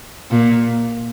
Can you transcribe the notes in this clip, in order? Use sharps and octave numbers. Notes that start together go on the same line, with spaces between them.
A#2